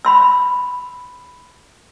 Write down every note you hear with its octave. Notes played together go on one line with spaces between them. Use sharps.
B5 C6 E6